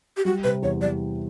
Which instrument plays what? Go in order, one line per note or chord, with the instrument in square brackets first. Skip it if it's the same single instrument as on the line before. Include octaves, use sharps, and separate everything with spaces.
[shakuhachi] G4
[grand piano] G3 [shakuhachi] F#4
[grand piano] C3 [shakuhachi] B4
[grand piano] E2 [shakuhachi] C#5
[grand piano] G3 [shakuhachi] D5